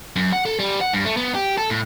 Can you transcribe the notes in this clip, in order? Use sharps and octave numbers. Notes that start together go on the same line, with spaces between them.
F#2
F#5
A4
G3
F#5
G2
A3
B3
G4
A4
A2